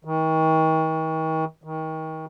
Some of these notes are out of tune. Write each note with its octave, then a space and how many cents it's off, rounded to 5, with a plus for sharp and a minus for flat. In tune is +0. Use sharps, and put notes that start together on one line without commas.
D#3 +40
D#3 +30